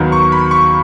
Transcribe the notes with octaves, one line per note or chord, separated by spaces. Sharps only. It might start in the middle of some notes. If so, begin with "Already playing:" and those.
Already playing: D#2 D#3 F#3 B3
C#6
B5
C#6